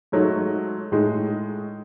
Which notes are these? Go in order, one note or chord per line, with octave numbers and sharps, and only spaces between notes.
G#2 F#3 A3 D#4
A2 G#3 D#4